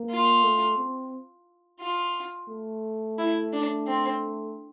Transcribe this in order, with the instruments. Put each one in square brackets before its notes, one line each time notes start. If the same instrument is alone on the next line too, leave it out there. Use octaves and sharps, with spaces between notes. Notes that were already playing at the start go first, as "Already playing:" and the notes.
Already playing: [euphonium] A#3
[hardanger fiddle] F4
[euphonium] A3
C4
[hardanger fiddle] F4
[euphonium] A3
[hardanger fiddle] E4
D4
C4